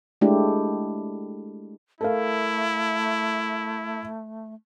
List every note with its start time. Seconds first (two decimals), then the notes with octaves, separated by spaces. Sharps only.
0.21 G#3 A3 D4 E4 G4
2.01 A3 E4 A4 A#4 F5